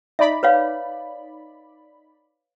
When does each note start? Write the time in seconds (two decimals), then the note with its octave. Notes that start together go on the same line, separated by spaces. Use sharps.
0.19 D#4 D5 E5 B5
0.43 B4 C#5 F5